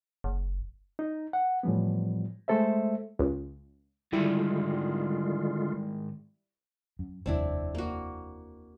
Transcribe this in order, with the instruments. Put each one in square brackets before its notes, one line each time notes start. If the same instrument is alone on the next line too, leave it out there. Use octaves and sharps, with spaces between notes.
[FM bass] F#1
[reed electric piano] D#4
F#5
A2 E3 F3 G3 B3
G#3 A3 A4 C5 E5
[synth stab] C#2
[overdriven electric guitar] G#2 D#3 [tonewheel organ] D3 G#3 F4 [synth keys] G3 E4
[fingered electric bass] F#2
[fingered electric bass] F1 D#2 G3 [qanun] C4 D4 E4
[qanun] A#3 F#4